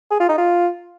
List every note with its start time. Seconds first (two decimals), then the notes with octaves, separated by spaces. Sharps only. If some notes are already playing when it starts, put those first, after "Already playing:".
0.11 G#4
0.20 F4
0.29 D#4
0.38 F4